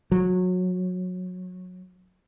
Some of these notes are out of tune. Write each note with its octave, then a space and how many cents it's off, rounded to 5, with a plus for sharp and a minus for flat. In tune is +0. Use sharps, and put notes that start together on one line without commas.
F#3 -20